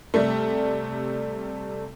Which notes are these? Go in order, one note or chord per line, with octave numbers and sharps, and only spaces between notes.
C3 G3 A3